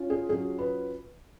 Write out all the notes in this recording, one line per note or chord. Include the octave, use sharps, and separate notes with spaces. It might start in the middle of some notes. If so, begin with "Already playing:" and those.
Already playing: C#4 F4
G#4
F#3 C#4 F4 G#4
B4